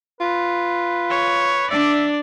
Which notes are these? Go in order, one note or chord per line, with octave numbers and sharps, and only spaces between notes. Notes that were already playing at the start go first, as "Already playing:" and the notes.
F4 B4
C#5
D4 D5 E5